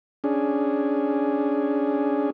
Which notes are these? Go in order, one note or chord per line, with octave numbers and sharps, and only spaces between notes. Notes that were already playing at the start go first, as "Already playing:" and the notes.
C#4 D4 G#4